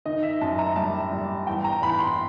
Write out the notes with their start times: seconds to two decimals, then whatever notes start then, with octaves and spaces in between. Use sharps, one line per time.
0.06 D#3 D#5
0.23 E5
0.41 F#2 A5
0.58 A#5
0.76 G3 A5
1.12 G3
1.47 E2 G5
1.64 A#5
1.82 E2 B5
1.99 C6